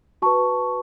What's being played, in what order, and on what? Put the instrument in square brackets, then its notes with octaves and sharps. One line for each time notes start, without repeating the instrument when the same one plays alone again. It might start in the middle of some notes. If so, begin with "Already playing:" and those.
[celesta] F#4 B4 A5 C#6